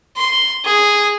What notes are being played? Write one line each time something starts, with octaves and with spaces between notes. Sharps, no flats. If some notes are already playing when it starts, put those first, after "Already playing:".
C6
G#4